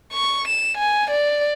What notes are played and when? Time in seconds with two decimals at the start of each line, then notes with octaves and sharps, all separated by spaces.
0.13 C#6
0.48 E7
0.78 G#5
1.10 D5